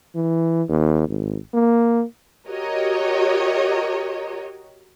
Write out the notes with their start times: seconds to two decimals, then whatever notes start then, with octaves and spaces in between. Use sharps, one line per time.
0.15 E3
0.69 D#2
1.09 G#1
1.54 A#3
2.48 F#4 G4 A#4 C#5 D#5